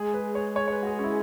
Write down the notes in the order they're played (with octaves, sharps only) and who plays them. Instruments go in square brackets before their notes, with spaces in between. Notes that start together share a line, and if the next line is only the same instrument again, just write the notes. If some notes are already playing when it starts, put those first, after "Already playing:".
Already playing: [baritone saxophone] G#3 [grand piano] G#4
[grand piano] B4
C#5
C#5
C#5
B4
F#4
G#4
C#4
E4